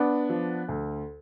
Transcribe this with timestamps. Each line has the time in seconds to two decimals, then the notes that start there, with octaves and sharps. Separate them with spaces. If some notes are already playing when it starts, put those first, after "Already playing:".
Already playing: B3 D4
0.29 F3
0.69 D2